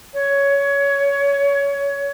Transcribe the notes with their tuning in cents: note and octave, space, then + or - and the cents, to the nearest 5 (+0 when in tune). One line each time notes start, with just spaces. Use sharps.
C#5 +20